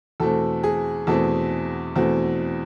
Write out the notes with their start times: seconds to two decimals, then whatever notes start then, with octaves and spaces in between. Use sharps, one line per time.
0.20 E2 B2 A3 C4 A4
0.63 G#4
1.07 E2 B2 A3 C4 A4
1.96 E2 B2 A3 C4